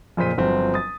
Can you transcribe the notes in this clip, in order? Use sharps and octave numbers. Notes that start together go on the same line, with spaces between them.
F2 A#2 C#3 C5 B6 D#7
G1 F3 F#3 C4
D#6 A6